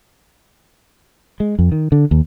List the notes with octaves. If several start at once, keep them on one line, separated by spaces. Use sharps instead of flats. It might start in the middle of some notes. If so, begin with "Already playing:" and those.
G#3
F2
D#3
D3
D#2